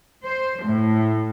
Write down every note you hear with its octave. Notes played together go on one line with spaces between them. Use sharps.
C5
A2